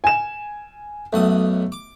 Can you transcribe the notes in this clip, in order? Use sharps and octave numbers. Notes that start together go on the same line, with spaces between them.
G#5 E7
B1 F#2 A3 D#6
D6